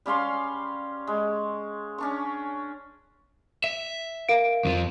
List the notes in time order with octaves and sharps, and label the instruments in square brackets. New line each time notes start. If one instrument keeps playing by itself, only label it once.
[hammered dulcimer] G3 C#4 F5 C6
G#3
C#4 D4 C#6
[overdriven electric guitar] E5
[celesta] A#4 F5 D7
[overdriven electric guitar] F2 F3